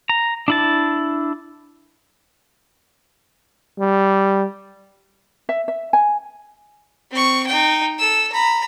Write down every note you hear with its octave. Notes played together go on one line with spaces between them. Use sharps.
A#5
D4 E4 A5
G3
E5
E5
G#5
C4 C#6
D#4 G5
A4 E6
A#5 B5